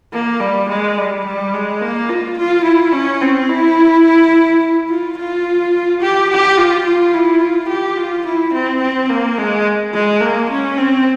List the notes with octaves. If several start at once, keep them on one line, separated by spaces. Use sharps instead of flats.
A#3
G3
G#3
G3
G3
G#3
A#3
F4
F4
E4
C#4
C4
E4
F4
F4
G4
G4
F4
F4
E4
F4
G4
F4
E4
C4
C4
A#3
G#3
G#3
A#3
C#4
C4